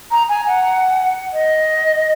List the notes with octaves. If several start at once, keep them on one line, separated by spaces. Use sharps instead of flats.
A#5
G#5
F#5
D#5